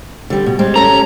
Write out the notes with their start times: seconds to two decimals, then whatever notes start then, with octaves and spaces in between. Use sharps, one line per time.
0.30 D3 G3
0.46 B2
0.59 G3 G#3 C4
0.76 C#4 A4 A#5